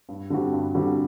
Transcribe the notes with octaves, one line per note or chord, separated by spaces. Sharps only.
G2
D3 G3 C4 F#4
G2
D3 G3 C4 F#4